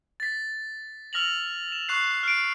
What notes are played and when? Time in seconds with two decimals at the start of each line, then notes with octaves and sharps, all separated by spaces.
0.20 A6 B6
1.13 E6 F6 A#6 F7 F#7
1.72 E7
1.89 C#6 F#6 C7
2.23 F6 C7 D7